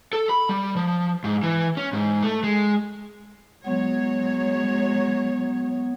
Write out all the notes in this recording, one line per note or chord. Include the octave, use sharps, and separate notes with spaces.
A4
B5
G3
F3
G#2
E3
C#4
G#2
A3
G#3
F#3 G#3 B3 C#5